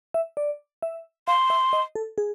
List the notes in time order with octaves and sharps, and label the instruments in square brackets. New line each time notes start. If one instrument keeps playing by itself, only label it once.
[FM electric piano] E5
D5
E5
[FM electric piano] F5 [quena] C6
[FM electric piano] E5
D#5
A4
G#4